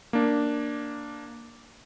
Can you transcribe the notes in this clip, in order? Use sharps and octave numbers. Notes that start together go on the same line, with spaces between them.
A#3 D4